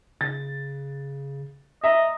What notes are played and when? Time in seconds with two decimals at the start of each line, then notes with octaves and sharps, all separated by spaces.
0.21 C#3 A6
1.84 D#5 E5 A#5